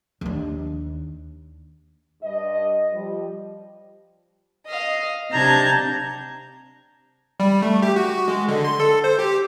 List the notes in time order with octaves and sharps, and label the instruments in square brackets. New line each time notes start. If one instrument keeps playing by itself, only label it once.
[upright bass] D#2 D4
[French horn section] G2 D#5
F3 G3
[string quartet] D#5 F5
C3 D4 A5 A#5 G6 G#6
[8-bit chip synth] G3
A3
G4
F#4
G#3
D3
C6
A4
C5
G4